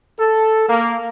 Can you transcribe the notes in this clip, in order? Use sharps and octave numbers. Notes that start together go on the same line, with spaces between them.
A4
A#3